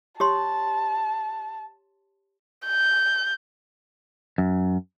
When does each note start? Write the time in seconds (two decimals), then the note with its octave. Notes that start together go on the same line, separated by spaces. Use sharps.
0.20 G4 C#5 A5 C6
2.66 G6
4.38 F#2